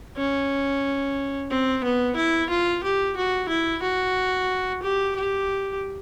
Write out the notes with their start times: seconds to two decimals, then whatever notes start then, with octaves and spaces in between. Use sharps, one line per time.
0.17 C#4
1.51 C4
1.84 B3
2.16 E4
2.50 F4
2.83 G4
3.17 F#4
3.49 E4
3.83 F#4
4.82 G4
5.16 G4